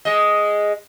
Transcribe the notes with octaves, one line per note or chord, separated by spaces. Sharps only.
G#3 D#5